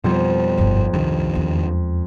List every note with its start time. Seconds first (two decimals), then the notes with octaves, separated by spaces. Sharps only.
0.04 F2 B2 G3
0.58 G1 G#2
0.93 C2 G2 D#3
1.35 E2 G#3